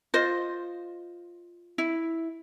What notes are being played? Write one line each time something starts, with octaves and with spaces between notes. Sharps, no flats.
F4 C5 D#5
E4